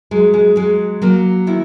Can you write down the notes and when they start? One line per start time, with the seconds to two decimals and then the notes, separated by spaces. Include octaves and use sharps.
0.11 F#3 G#3
0.34 G#3
0.56 F#3 G#3
1.02 F#3 A#3
1.47 D#3 E4